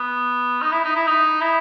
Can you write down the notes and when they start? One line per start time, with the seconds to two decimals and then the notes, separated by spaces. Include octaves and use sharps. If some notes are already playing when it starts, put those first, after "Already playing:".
Already playing: B3
0.61 D#4
0.72 E4
0.84 D#4
0.96 E4
1.07 D#4
1.41 E4